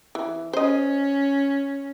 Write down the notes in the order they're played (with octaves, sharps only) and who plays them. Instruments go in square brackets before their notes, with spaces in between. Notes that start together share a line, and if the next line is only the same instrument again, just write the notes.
[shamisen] E3
[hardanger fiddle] C#4 [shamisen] C5 D#5